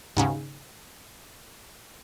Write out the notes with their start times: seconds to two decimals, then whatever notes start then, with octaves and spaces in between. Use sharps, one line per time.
0.17 D#2 G#2 C#3